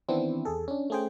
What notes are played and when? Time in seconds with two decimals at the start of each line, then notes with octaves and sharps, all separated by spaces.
0.09 D#3 E3 B3 C4 D4 E4
0.45 E2 G#4 A4
0.68 C#4 D4
0.90 A3 C#4 G#4 C5 G5